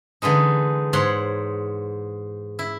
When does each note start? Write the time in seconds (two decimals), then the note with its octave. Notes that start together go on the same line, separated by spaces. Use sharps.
0.22 D3 E3 G#3 D#4
0.93 G#2 C#5 F#5 C6
2.59 E4